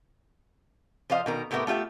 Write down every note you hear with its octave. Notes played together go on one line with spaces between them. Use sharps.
F3 C5 D#5 F5
B2 D#3 A#4
A2 A3 B3 G4 A#4 E5
A3 F4 G4 E5